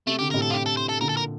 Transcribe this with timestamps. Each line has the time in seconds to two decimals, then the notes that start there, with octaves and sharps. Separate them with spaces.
0.07 C3 A3
0.19 D3 G4
0.31 A2 C3 A#4
0.42 A4
0.50 F4
0.53 G4
0.66 A4
0.77 C5
0.89 A4
1.01 A#2 D3 A#4
1.09 A4
1.17 A#4